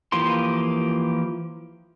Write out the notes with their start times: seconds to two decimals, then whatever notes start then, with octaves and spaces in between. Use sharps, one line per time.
0.12 E3 F3 A#3 G4 C6